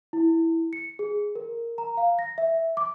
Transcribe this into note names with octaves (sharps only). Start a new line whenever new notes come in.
E4
C#7
G#4
A#4
A#5
F5
A#6
E5
D6